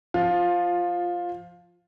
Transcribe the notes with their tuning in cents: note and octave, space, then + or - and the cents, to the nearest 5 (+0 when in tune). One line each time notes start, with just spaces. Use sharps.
F3 +0 F4 +15